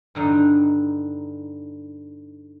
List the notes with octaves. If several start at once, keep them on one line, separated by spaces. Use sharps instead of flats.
G2 D3 D#4